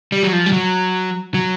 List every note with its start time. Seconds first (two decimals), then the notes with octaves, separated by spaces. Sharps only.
0.12 G3
0.23 F#3
0.33 F3
0.46 G3
0.52 F#3
1.34 F#3